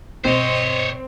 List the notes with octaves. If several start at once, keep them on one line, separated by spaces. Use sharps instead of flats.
G2 B2 C4 C5 C#5 D#5